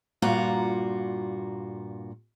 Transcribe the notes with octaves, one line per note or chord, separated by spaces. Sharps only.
G2 A#2 F4 F#4 A#5